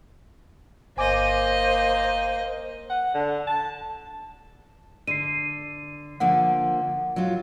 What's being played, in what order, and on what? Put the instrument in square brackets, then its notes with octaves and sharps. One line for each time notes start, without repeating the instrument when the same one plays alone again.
[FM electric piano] G1 G#5 D6 [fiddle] A#3 D#5 [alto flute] C5
[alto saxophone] F#5
D3
A5
[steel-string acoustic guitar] D3 [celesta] C7 D#7
[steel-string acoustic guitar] D3 F3 A#3 [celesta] F#5
[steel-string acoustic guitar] F#3 F4